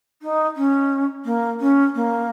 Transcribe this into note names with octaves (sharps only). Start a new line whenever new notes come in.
D#4
C#4
A#3
C#4
A#3